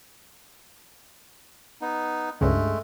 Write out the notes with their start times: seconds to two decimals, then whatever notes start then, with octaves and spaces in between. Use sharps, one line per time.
1.81 B3 D#4
2.41 C#2 G2 C#3 G#3 A3